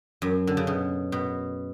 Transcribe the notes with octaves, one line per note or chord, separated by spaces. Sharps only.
F#2
D3
C#3
B2
B2